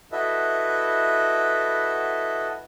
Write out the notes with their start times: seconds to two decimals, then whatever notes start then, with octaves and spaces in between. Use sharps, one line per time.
0.12 E4 F#4 A4 B4 D#5 E5